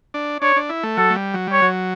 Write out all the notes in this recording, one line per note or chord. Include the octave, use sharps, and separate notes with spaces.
D4
D4 C#5
D4
E4
A3
F#3 A4
A3
G3
F#3
G3 C#5
F#3